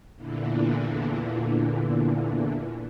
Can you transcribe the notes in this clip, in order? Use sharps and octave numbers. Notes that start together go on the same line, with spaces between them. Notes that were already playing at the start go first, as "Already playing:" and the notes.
E2 A#2 D3 E3